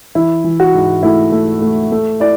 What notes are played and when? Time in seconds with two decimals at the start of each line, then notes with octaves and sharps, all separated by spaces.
0.15 E3 E4
0.44 E3
0.60 F#4
0.74 G#2
1.03 A3 E4
1.32 A3
1.62 A3
1.92 A3
2.20 E4 D5